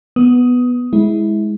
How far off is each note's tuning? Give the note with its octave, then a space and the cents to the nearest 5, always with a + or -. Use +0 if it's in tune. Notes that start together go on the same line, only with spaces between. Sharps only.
B3 +0 D#6 +15
G#3 +0 E4 -20